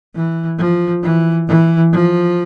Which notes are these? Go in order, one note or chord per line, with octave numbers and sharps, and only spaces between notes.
E3
F3
E3
E3
F3